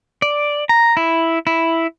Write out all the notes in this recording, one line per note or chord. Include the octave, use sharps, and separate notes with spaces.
D5
A#5
E4
E4